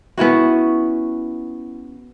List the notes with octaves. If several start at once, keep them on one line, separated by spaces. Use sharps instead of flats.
B3 C#4 E4 F#4